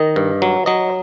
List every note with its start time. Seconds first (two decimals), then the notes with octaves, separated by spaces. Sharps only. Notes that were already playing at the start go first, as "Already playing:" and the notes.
Already playing: D#3 D#5
0.16 G2
0.42 F#3
0.66 F#3 D#5